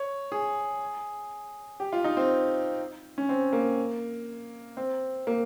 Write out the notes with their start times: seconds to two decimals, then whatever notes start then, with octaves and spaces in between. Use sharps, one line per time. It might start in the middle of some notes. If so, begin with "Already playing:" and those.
Already playing: C#5
0.32 G#4
1.80 G4
1.93 F4
2.04 D#4
2.17 C4
3.18 C#4
3.29 C4
3.53 A#3
4.77 C4
5.27 A#3